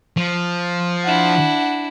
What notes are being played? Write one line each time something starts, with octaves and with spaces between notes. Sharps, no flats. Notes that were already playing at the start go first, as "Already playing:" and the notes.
F3
D4 E4 F#5